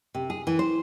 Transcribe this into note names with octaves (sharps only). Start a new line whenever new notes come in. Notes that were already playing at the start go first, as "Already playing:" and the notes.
C3
G#4
E3
C5